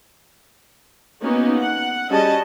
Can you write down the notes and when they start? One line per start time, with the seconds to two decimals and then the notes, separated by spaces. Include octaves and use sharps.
1.22 A#3 B3 C#4 D#4 F#4
1.57 F#5
2.10 G3 C#4 F#4 G#4 D#5 A5